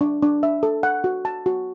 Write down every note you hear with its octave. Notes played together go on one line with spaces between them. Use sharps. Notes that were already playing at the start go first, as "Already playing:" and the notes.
D4
D4
E5
A4
F#5
F#4
A5
F#4